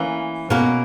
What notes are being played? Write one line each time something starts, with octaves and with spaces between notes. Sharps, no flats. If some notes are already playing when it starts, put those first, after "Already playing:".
Already playing: E3 A#3 C#4
B2 A#3 C#4 F#4 A#4